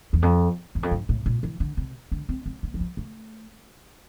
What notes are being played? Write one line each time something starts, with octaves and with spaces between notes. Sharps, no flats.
E2
F2
E2
F2
G2
A2
A#2
E3
D3
C3
D3
C4
C4
A#3
F3
G3
A3